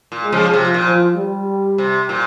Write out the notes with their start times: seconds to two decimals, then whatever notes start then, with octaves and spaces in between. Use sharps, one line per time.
0.12 A#2
0.22 G#3
0.32 C#3 F3
0.53 C3 F3
0.74 A#2
0.84 F3
1.16 G3
1.78 C3
2.09 A#2